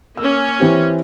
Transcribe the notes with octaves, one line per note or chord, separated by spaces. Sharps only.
A#3 C#4 E6
E3 C4 G4